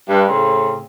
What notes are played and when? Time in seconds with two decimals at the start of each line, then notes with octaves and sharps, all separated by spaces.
0.08 G2
0.27 A2 C#3 C4